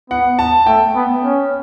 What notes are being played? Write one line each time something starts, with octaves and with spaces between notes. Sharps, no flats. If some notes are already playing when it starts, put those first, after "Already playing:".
B3 F#5
A5
A3 G5
B3
C#4